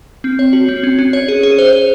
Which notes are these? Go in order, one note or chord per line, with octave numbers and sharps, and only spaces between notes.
C4
C#5
F#4
C4
C#4
C#4
C#5
G#4
G#4
C5
C5